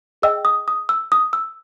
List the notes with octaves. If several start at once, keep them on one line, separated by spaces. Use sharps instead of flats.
G#4 D#5 G5 E6
D#6
D#6
E6
D#6
E6